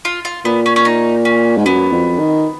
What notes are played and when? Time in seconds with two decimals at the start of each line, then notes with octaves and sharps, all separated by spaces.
0.05 F4
0.25 F4
0.45 A#2 B3
0.66 C#4
0.76 C#4
0.85 D#4
1.25 C#4
1.57 G#2
1.65 F#2 B3
1.92 F2
2.19 D#3